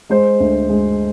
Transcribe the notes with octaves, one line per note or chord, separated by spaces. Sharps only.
G#3 C5
D2
G#3